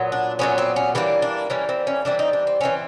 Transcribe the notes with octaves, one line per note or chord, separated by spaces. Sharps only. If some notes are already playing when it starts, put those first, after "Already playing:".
Already playing: A#2 F#3 B3
D4
A#2 F#3 B3 C#4
C4
C#4
E3 G3 A#3 D4
D4
E3 G3 A#3 C#4
C4
C#4
E3 G3 C4 D4
D#4
D4
C4
E3 G3 C4 C#4